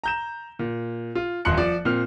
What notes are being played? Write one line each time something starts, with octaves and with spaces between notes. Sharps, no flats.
A#5 G6 E7
A#2
F4
D#1 F2 C6 F#6 C#7
F3 D5
A#2 C4 F6